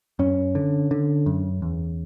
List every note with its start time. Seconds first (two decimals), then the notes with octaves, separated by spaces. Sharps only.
0.19 F#2 C#4
0.55 D3
0.91 D3
1.26 F#2
1.62 E2